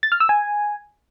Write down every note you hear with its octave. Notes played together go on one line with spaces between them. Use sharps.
A6
F6
E6
G#5